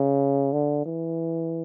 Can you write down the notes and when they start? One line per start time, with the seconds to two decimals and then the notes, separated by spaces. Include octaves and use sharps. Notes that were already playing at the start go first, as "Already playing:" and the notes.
Already playing: C#3
0.53 D3
0.86 E3